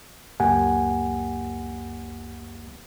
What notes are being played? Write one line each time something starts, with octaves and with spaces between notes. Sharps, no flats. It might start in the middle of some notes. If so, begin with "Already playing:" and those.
C#2 F#2 A#3 G4 F#5 G#5